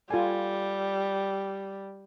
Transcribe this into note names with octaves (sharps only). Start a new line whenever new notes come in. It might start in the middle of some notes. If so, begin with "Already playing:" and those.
G3 F4 A4 G#5